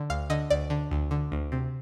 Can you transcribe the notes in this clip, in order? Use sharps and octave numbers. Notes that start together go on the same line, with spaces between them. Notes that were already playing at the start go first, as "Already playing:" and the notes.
Already playing: D3
D2 F5
D3 D#5
D2 D5
D3
D2
D3
D2
C3